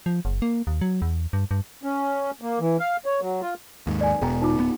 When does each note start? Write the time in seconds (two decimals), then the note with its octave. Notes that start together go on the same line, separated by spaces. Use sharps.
0.06 F3
0.25 F#1
0.42 A#3
0.67 D#2
0.81 F#3
1.02 E2
1.33 G2
1.51 G2
1.83 C#4
2.41 A#3
2.60 E3
2.80 F5
3.06 C#5
3.21 F#3
3.42 F4
3.87 D#2 G#2
4.01 D5 G#5
4.21 E1 B2 G#4 G5 A#5
4.42 D#4 F4 D6
4.57 D1 B3